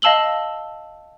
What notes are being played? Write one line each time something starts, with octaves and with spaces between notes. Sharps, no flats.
D#5 F5 A5 E6 F#7 G7